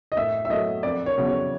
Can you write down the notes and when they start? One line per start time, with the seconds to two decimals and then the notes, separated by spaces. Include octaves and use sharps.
0.12 D#5
0.17 A2 E5
0.45 E5
0.50 F#3 A3 D#5
0.83 F2 D5
1.06 C#5
1.18 C#3 F#3 B3
1.29 C#5